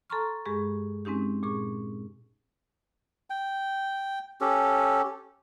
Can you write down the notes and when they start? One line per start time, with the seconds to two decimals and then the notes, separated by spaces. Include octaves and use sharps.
0.10 A4 A5 A#5 C6 C#6 F6
0.45 G2 G#3 G4 G#4 C#6
1.05 G#3 C4 C#4 D#4 G4
1.43 A#2 G#4 C#6
3.30 G5
4.41 C#4 G4 A4